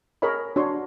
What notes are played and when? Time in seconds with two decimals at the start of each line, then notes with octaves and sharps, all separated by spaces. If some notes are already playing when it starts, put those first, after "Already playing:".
0.22 G#4 A#4 C#5 D#5 B5
0.56 D4 F#4 C#5 C6